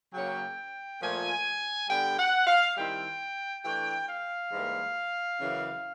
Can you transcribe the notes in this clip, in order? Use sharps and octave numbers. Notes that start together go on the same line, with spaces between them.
C#3 F#3 A#3 C#4 G5
A#2 F3 A3 G#5
D3 G3 B3 G5
F#5
F5
D#3 G3 C4 E4 G5
E3 A3 D4 G5
F5
G#2 E3 G3 A#3
F#2 C#3 E3